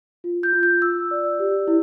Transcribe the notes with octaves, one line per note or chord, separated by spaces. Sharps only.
F4
G6
F4
G6
F4 E6
D5
G4
E4